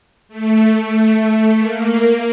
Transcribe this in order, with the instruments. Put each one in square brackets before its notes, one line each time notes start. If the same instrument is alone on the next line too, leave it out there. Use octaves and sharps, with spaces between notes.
[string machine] A3
A#3